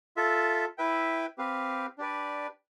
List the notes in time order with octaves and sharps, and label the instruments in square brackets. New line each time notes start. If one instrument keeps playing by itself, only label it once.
[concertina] F4 A4 E5
E4 B4 E5 G5
C4 G4 B4 F5
D4 G4 B4 D5